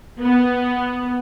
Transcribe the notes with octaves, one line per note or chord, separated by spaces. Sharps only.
B3